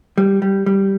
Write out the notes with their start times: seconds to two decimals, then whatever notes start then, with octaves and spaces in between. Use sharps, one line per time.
0.18 G3
0.42 G3
0.66 G3